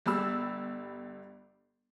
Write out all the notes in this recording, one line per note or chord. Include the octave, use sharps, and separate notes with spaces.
G1 G3 B5 E6